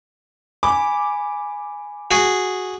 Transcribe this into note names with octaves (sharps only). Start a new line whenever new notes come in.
G#5 B5 D6
F#4 G#4